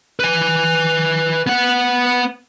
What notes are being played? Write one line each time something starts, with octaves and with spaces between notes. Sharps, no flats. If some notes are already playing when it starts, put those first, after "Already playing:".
B4 G#5
B3 F#5